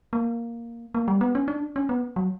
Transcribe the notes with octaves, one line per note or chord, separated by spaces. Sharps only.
A#3
A#3
G3
B3
C#4
D4
C#4
B3
F#3